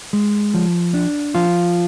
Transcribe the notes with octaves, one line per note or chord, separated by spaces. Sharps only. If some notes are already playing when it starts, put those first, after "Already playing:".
G#3
F3
D4
F3 F4